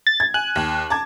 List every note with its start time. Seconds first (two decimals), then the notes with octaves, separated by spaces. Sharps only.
0.07 A6
0.20 G#6
0.34 G#5 F#6
0.56 D#2
0.90 A5 D6 G#6